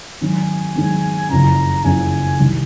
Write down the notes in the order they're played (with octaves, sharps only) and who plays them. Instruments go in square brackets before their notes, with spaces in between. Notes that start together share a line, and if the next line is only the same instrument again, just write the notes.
[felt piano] G#2 D#3 F#3 C4 [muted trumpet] G#5
[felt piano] G#2 D#3 F#3 C4
[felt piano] F#1 F2 C#3 [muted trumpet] A#5
[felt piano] F#1 F2 C#3 [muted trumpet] G#5
[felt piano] C2 C3 D#3